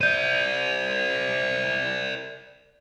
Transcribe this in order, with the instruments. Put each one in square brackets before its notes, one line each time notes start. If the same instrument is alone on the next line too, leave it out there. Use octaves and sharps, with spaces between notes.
[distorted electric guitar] C5 D5 [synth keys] G6 D#7